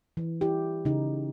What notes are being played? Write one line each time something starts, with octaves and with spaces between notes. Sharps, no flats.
E3
E4 G4
C#3 D#4